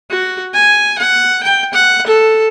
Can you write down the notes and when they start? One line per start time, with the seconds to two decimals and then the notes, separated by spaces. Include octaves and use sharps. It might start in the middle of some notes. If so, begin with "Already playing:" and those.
0.10 F#4
0.53 G#5
0.98 F#5
1.43 G5
1.74 F#5
2.06 A4